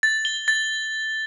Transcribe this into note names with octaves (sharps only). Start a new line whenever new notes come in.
A6
G7
A6